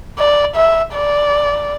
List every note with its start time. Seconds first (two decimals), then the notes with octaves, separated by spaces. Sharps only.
0.18 D5
0.56 E5
0.94 D5